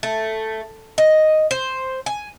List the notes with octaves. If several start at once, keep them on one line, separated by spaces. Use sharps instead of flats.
A3
D#5
C5
G#5